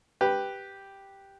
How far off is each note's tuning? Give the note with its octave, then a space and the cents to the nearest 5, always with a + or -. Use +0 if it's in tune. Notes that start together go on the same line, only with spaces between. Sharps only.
G4 +0 B4 +0